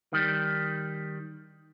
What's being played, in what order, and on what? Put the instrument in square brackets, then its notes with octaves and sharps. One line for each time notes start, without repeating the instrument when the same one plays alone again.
[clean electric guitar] D#3 G3